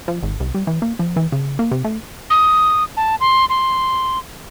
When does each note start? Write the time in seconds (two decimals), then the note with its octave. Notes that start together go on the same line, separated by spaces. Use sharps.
0.08 F3
0.23 G#1
0.40 C2
0.55 G3
0.67 E3
0.82 A#3
0.99 F3
1.16 E3
1.32 C#3
1.59 A#3
1.71 C3
1.84 A3
2.30 D#6
2.97 A5
3.20 C6
3.49 C6